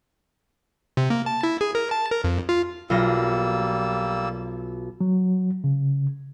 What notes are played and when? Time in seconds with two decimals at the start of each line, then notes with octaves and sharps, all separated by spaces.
0.97 C3
1.10 A#3
1.26 A5
1.43 E4
1.61 G#4
1.75 A#4
1.91 A5
2.11 A#4
2.24 F2
2.49 F4
2.90 B1 G3 A#3 F4 E6 A#6
5.01 F#3
5.64 C#3